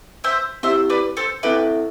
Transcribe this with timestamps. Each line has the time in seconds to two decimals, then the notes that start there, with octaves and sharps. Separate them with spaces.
0.24 C5 E5
0.63 C4 E4 G4 C5 E5
0.90 B4 D5
1.17 A4 C5
1.43 C4 E4 G4 A4 B4 E5